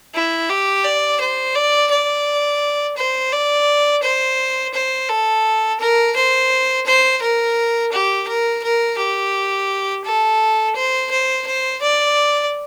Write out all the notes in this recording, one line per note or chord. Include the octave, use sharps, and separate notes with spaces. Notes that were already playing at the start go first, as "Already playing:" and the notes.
E4
G4
D5
C5
D5
D5
C5
D5
C5
C5
A4
A#4
C5
C5
A#4
G4
A#4
A#4
G4
A4
C5
C5
C5
D5